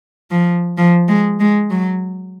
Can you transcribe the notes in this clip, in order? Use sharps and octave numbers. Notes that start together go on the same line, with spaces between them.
F3
F3
G#3
G#3
F#3